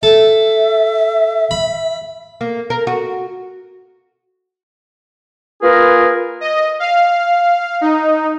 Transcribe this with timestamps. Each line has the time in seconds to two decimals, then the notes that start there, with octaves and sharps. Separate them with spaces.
0.03 A4 E5
1.51 B5
2.41 A#3
2.70 A#4
2.87 F#4
5.62 A#3 F4 G#4 A#4 B4
6.41 D#5
6.80 F5
7.81 D#4